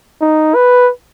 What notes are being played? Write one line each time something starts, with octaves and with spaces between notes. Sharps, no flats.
D#4
B4